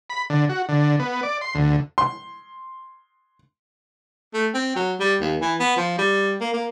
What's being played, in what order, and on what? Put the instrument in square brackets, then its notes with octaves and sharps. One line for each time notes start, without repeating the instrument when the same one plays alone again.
[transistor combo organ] B5
D3
F#4
D3
B3
D5
C6
D2
[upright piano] C6
[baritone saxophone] A3
C4
F#3
G3
D#2
E3
B3
F3
G3
A#3
A#3